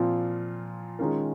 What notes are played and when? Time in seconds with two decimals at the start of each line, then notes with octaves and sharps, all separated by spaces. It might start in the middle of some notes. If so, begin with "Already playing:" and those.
Already playing: A#2 F3 C4 F4
0.99 D#3 G#3 C#4 F4 A#4